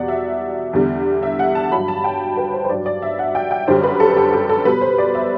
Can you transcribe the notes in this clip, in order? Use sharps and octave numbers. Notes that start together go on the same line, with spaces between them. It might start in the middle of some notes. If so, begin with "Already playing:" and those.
Already playing: E2 B2 G3 D5 F#5
E5
E2 D3 G3
E5
F#5
A5
G2 F#3 B5
A5
G5
B4
C5
C5
G2 F#3 D5
D5
E5
F#5
G5
G5
F#2 D3 G3 C5
B4
A4
G4
G4
A4
B2 G3 B4
C5
D5
E5